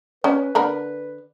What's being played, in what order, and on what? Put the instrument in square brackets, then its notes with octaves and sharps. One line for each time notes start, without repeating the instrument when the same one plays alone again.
[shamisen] C#4 [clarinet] B4
[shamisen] D3 A#4 B5